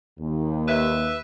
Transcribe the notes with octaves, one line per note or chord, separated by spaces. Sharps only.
D#2
B4 E5